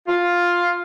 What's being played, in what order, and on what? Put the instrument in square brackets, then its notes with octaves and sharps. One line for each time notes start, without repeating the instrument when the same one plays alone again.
[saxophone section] F4